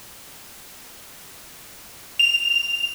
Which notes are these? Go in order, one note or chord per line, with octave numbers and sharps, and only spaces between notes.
F7